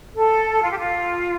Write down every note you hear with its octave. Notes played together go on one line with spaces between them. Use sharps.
A4
F4
G4
F4